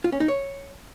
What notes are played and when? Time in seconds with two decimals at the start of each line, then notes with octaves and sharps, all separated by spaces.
0.04 F4
0.12 C#4
0.20 D#4
0.28 C#5